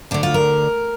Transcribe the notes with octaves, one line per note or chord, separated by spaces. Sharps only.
D2 D3 D4
F4
A#4